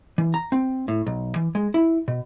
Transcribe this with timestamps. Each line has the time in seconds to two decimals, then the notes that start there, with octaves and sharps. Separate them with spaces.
0.18 E3
0.34 A#5
0.52 C4
0.88 A2
1.07 B1
1.36 E3
1.55 G#3
1.74 E4
2.08 B2